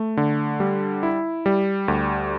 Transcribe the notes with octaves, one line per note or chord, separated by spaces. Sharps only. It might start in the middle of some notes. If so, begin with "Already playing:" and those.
Already playing: A3
D3
G3
E4
G3
D2